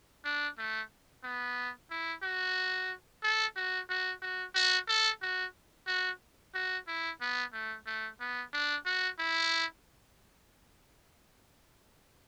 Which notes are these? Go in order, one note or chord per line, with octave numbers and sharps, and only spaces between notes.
D4
A3
B3
E4
F#4
A4
F#4
F#4
F#4
F#4
A4
F#4
F#4
F#4
E4
B3
A3
A3
B3
D4
F#4
E4